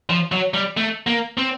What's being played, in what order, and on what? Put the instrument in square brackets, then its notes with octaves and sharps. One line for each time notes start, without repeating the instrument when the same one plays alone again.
[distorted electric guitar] F3
F#3
G3
A3
A#3
C4